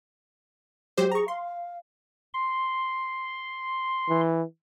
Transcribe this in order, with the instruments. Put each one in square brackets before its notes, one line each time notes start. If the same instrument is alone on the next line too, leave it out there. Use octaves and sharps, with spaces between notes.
[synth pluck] F#3 G4 C5 [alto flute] G#3
[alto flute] G#4 [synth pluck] A#5 C#6
[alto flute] F5 [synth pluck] C6
[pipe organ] C6
[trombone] E3